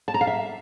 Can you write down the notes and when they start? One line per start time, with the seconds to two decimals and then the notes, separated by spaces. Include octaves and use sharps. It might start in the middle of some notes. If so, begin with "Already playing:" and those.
0.08 A5
0.14 A#5
0.21 F5
0.27 E5